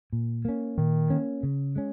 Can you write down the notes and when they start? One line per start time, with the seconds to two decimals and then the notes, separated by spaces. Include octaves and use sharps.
0.13 A#2
0.45 A#3 C#4
0.78 A#2 D#3
1.10 A#3 C#4
1.43 C#3
1.76 G#3 C#4